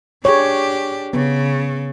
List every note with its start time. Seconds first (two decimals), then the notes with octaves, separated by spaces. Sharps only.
0.25 D4 G4 G#4 C#5
1.13 C#3 B3